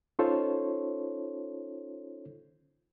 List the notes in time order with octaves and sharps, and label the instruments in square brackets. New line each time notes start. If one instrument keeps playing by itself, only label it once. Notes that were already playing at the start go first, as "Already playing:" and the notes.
[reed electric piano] C#4 D#4 F4 A4 C5 C#5